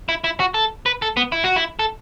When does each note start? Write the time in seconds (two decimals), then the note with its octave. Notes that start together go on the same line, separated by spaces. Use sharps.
0.09 E4
0.24 E4
0.40 F#4
0.54 A4
0.86 B4
1.02 A4
1.17 B3
1.32 E4
1.44 F#4
1.56 E4
1.79 A4